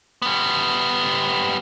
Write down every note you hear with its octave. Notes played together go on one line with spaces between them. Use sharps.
G3 B3